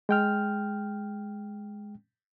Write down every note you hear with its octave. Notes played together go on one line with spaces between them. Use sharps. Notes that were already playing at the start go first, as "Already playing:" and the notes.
G#3 G5 F6